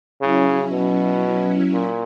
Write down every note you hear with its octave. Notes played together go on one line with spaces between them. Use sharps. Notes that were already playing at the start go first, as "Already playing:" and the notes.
C#3 F#3 C#4 E4
B2
A#2